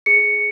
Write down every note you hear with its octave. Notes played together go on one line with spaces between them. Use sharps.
G#4 C#7